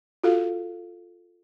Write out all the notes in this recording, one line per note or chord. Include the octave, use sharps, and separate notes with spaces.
F4 F#4 A4 F5